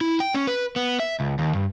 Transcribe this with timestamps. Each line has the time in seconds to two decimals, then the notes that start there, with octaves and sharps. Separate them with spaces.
0.01 E4
0.20 G5
0.35 C#4
0.47 B4
0.76 B3
1.00 E5
1.20 C#2
1.39 D#2
1.55 G2